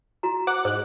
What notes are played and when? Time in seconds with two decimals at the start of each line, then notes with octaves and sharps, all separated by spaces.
0.23 E4 F#4 A#5
0.47 C5 F#5 D6 F#6
0.65 G#2 F#6